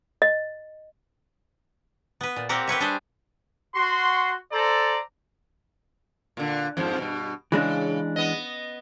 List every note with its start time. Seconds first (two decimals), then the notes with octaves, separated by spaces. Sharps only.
0.22 D#5
2.21 B3 B4
2.36 A#2
2.49 A#3 C4 G4 A#4 F#5
2.67 G4 B4 C#5 E5
2.80 G3 D4 G4 G#4 C5 G5
3.75 F#4 C6
4.52 A4 C5 D5 A#5
6.37 A#2 D3
6.77 F2 G#2 F3
6.98 G2 B2
7.52 C#3 E3 G#3 D4
8.16 B3 D#5